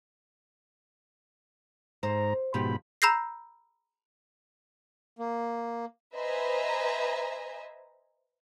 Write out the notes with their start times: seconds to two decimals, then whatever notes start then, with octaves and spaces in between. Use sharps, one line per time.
2.03 G#2 C5 A#5
2.54 G#2 B2 F3 G4 B5
3.02 A#5 B5 E6 G6 A#6 C7
5.19 A#3
6.15 B4 C5 D#5 E5 G#5 A#5